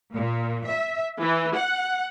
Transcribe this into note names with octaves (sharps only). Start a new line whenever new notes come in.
A#2
E5
E3
F#5